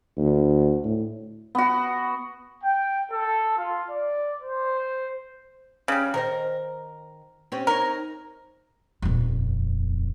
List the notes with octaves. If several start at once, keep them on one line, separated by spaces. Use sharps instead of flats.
D2
A2
B3 F#4
G5
A4
F4
D5
C5
C#3 G3
D#3 A#4 C5 D#5
C4 C#4 G4
D#4 A#4 C#5
D#1 F2